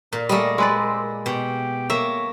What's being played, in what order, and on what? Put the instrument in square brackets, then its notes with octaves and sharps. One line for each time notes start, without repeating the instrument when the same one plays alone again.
[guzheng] A#2 [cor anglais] A#3
[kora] G3 A3 [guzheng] A#3 D#5 [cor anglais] G#4
[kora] G#3 B4 D5 [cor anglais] C4
[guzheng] B2 [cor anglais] G4
[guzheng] A#3 [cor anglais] C#5 [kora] E5